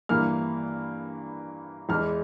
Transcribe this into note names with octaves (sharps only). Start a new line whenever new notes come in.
G2 E3 A#3 F6
E2 E3 G#3 F6